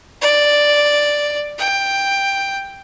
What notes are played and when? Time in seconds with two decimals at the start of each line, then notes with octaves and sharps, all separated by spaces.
0.21 D5
1.59 G5